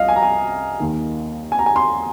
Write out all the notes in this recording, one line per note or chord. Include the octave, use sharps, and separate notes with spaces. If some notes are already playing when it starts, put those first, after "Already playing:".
Already playing: C2 F3 D#5 F5
G#5
A#5
G#5
D#2 D#3
G#5
A#5
G#5
C6